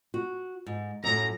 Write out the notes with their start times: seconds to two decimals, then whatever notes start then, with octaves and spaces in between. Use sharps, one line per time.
0.14 F#4
0.67 G#2
1.04 F#2 A2 A#5